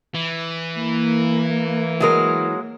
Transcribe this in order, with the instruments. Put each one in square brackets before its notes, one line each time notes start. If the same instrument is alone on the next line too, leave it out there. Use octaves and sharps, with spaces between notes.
[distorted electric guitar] E3
[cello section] A#3
[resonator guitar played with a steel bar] F#3 G#3 A#4